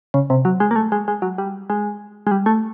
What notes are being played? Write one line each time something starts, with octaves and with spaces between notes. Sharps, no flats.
C#3
C3
F#3
G#3
A#3
A3
G#3
G#3
F#3
G3
G#3
G#3
G3
A3